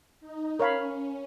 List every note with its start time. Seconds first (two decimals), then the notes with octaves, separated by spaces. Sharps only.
0.20 D#4
0.59 C#4 A#4 C#5 F5 B5